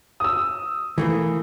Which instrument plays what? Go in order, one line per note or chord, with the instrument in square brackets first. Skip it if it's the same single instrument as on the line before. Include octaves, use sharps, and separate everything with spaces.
[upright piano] D#6 E6
[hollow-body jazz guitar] E3 A3 A#3